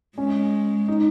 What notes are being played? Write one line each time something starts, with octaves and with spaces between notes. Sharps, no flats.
G#3 C#4
D#4